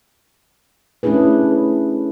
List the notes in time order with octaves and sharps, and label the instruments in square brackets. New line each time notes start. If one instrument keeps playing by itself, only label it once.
[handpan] A3 C#4 D4 E4 G#4 B4